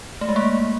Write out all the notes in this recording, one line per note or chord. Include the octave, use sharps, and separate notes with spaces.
A3
G#3
A#3